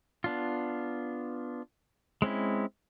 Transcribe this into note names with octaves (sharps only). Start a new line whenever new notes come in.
B3 D4 F4
G#3 C4 C#4 E4